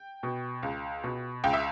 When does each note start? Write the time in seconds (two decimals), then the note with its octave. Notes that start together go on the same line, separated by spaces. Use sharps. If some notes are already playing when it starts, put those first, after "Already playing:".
Already playing: G5
0.23 B2
0.63 C#2
1.04 B2
1.44 C#2 G5
1.53 E5